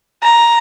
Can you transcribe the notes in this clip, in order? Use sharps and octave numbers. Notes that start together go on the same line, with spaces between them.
A#5